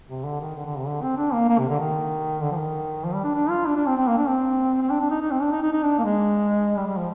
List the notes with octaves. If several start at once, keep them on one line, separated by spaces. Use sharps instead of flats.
C3
D3
D#3
D3
D3
C3
D3
C4
D4
A#3
A#3
C3
D3
D#3
D3
F3
D#3
F3
G3
D4
D4
F4
D4
D4
C4
C4
A#3
D4
C4
C4
D4
D4
D#4
D#4
C4
D4
D#4
D#4
D#4
D4
A#3
G#3
G3
G3
F3